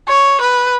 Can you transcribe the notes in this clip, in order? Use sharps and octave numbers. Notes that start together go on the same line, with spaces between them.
C#5
B4